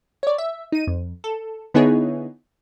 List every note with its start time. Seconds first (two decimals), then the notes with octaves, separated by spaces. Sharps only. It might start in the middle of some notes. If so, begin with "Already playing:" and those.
0.23 C#5 D5
0.38 E5
0.72 D#4 D#7
0.87 F2
1.24 A4
1.74 D3 B3 D#4 E4 G#4 C#5